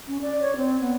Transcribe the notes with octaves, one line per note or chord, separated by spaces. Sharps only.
C#4
D5
C#5
C4
B3